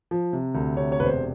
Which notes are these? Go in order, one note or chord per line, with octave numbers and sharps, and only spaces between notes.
F3
C3
D2
C3 C#5
C#5
E1 B4
C5